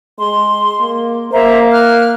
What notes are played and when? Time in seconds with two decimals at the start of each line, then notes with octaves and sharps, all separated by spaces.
0.19 G#3 C6
0.80 A#3
1.32 A#3 C5 E5 A#5
1.73 F6 F#6